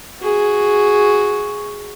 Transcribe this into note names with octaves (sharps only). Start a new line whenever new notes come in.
F#4 G#4